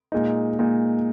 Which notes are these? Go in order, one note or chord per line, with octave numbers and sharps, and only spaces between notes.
A#2 G#3 D#4
A#2 G#3 D#4